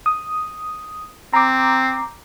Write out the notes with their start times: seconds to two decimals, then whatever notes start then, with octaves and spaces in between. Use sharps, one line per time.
0.06 D#6
1.33 C4 A#5 D6